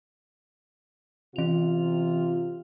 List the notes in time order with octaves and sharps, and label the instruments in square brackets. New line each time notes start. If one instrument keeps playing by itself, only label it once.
[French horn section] C3 F4 [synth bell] E3 F7